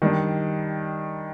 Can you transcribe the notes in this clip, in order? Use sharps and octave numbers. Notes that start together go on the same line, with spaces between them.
D#3 G3 D4